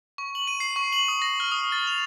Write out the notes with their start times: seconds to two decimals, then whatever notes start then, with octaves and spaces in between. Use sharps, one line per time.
0.18 C#6
0.35 F#7
0.47 D#7
0.60 C7
0.76 C#6
0.93 F#7
1.08 D#6
1.22 A#6
1.40 F6
1.52 D#6
1.72 A6
1.87 F7